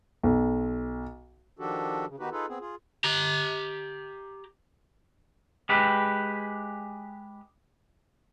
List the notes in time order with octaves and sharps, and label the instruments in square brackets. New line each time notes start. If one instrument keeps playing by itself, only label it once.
[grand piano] B1
[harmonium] D#3 F3 D4 F#4 G4 A4
C#3
D#3 B3 D#4 F#4 G4 B4
D#4 F4 G#4 A4 B4
B3 C4 G#4
F4 G#4
[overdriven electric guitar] G4 A#5
[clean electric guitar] G#3 G4 B4